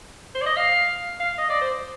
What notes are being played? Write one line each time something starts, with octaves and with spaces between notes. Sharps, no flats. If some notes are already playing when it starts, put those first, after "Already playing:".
C5
D5
D#5
F5
F5
D#5
D5
C5